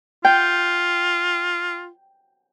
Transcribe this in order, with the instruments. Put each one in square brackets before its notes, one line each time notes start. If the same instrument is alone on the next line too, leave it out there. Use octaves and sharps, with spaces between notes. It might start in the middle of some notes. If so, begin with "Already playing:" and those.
[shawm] F4 [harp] G5